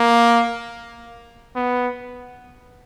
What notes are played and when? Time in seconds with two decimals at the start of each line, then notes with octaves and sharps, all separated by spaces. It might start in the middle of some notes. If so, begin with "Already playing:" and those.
Already playing: A#3
1.56 B3